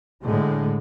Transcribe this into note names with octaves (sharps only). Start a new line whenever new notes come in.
A2 D3 G#3